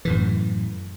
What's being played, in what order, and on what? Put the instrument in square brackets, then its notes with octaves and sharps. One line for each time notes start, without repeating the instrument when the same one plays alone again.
[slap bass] F#2 A2 E3